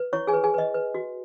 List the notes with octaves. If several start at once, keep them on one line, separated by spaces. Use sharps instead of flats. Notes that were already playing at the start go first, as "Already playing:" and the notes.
Already playing: B4
E4 C#5 C#6
G#4 G#5
B4
G#4 G#5
B4 D#5
B4
F#4